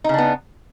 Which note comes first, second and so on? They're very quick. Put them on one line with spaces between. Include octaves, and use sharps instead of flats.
D#4 C#3 D4 B3